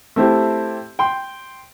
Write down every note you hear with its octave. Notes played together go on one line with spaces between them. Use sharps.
A3 C4 E4 G4
G5 C6